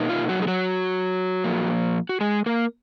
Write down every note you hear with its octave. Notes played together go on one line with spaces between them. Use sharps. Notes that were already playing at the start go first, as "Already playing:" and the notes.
Already playing: B2 A#3 D#4
F4
F#3 F#4
G#4
F#3 F#4
A#2 F3 A#3
F#4
G#3 G#4
A#3 A#4